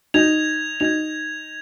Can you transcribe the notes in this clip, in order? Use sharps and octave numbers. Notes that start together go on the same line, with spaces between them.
D#4 G#6 F7
D#4 G#6 F7